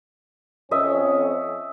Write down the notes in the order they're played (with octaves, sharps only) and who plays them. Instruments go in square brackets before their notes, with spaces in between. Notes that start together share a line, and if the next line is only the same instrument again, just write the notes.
[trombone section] F2 C#4 [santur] D#5 E5